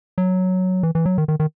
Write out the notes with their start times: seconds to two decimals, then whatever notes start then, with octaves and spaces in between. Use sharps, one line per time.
0.18 F#3
0.83 E3
0.95 E3
1.05 F#3
1.18 D#3
1.28 D#3
1.40 D#3